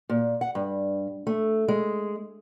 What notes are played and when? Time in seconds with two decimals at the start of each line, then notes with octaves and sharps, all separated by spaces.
0.09 A#2
0.41 F#5
0.55 G2
1.27 A3
1.68 G#3